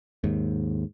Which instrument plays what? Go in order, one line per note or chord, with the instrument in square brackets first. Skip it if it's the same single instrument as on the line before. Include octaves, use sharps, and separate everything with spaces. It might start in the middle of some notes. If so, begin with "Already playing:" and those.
[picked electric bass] D#2 G#2